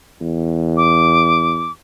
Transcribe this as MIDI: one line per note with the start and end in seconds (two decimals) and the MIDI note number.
0.21 1.68 40
0.77 1.72 86